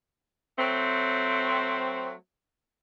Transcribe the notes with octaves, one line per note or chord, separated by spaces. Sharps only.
F#3 A3 C4